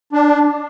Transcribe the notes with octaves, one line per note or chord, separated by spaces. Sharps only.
D4